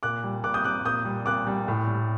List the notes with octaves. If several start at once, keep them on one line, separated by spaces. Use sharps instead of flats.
A#2 D6 F#6
G3
A#2 D6 F#6
D#6 G6
G3 D6 F#6
A#2 D#6 G6
G3
A#2 D6 F#6
G3
A2
G3